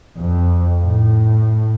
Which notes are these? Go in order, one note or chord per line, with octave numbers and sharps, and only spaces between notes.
F2
A2